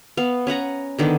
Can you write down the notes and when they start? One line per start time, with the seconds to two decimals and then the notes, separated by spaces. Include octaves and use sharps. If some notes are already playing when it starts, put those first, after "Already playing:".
0.17 B3 F5
0.47 C#4 B4 F#5 A#5
0.99 D3 D#3 B3 D4